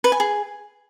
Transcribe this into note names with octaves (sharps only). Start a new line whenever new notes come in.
B4
G#5
G#4